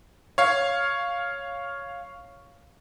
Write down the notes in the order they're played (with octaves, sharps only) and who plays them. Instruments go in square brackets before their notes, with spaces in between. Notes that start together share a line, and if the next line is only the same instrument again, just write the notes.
[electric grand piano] C#5 F5